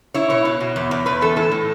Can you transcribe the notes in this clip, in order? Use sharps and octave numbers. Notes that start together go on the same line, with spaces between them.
E4 C#5
B2 C#5
B2
B2
E2
E2
E2 B4
E3 A4
A2 A4
A2